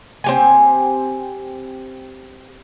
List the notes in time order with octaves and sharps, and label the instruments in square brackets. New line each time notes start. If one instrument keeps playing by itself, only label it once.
[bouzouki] C4 G4 G#5